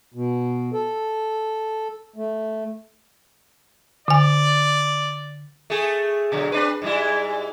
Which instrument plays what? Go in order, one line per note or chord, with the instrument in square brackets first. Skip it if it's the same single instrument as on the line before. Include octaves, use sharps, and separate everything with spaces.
[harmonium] B2
A4
A3
[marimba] D3 G#5 [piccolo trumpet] D5
[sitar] A3 G#4
B2 D3 F#3
C4 D4 B4
G#2 G3 E4